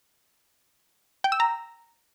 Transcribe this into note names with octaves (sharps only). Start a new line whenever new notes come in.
G5
E6
A#5